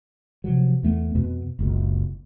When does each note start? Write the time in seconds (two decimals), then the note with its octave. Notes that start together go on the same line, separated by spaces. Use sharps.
0.44 C3 F3 F#3
0.83 E2 A3 B3
1.15 F2 B2 B3
1.59 F#1 C#2 B2